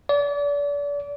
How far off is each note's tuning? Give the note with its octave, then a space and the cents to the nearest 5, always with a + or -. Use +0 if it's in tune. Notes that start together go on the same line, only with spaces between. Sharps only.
D5 -35